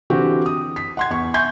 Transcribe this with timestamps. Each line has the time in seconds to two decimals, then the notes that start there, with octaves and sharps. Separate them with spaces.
0.10 D3 E3 C4 F#4 G4
0.46 D#6
0.76 B6
0.97 F#5 C6 G#6
1.10 E2 C#6
1.34 E5 G#5 C6 C#6 G6 G#6